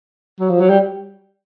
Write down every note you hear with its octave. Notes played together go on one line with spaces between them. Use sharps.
F#3
F3
F#3
G3